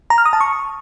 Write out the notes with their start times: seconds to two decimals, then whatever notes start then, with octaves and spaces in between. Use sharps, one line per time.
0.10 A#5
0.18 F6
0.25 D#6
0.33 A5
0.41 C#6